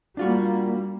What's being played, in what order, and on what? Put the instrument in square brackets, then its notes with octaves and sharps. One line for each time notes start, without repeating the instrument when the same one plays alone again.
[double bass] G3 A#3 [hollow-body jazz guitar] D4 F4 F#4